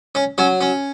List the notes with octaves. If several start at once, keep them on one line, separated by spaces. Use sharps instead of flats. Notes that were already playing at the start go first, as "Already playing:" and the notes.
C#4
F#3 C#4
C#4